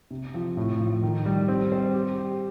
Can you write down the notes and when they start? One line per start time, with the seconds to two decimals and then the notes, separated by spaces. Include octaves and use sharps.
0.11 C3
0.34 F3
0.57 A2
0.80 F3
1.02 D#3
1.26 G3
1.48 C4
1.72 C5
1.94 G4
2.18 G4